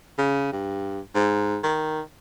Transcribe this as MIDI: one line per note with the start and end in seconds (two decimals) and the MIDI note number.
0.18 0.51 49
0.52 1.00 43
1.15 1.58 44
1.63 2.00 51